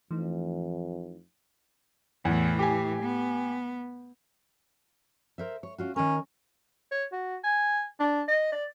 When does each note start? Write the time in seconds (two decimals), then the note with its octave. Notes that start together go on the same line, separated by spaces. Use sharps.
0.11 F2 E3 A3 D#4
2.25 E2 A2 E3
2.59 G4 G#5
3.02 B3
5.38 A#4 C5 E5
5.63 C#5
5.78 C#4 F4 F#4
5.96 D#3 C#4 A#4
6.92 C#5
7.12 F#4
7.44 G#5
8.00 D4
8.28 D#5
8.52 D5